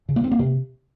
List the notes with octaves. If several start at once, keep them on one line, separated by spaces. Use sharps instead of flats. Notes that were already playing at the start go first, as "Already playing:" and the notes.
C#3
A#3
C4
A#3
C3